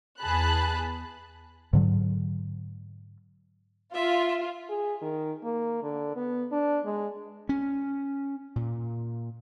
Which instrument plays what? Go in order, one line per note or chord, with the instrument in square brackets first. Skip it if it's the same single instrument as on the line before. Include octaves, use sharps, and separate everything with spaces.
[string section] E2 G#4 A5 B5 F#6
[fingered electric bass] G#2 D3 F#3
[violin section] F4 [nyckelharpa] E5
[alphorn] G#4
D#3
A#3
D3
B3
D4
G#3
[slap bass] C#4
A#2